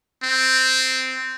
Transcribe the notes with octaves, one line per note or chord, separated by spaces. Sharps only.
C4